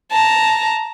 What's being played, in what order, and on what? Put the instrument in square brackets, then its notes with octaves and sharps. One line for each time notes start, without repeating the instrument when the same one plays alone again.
[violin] A5 A#5